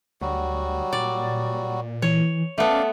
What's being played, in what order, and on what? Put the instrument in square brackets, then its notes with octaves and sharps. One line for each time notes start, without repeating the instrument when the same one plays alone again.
[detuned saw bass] D2 [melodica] F#3 G3 F#4
[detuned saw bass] A#2 [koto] D5
[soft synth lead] E3 [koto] C#5
[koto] A3 B3 [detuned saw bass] C#4 [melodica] D5 F5 [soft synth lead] A5